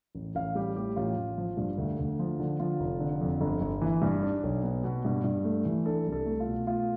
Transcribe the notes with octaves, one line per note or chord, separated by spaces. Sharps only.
A1
A1 F5
G3 G4
A2 G4
A1 F4
A1
F3
G2
D2
D2
F3
D3
F3 F4
F1
D3
F2
G1
G1
E3
G2
D4
B1
B3
B2
G2
G2
A3
E3
D4 A4
C2
A4
A3
F4
B2
A3 F4